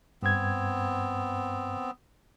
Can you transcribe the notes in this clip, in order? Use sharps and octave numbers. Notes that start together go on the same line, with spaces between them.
G2 B3 C4 G#6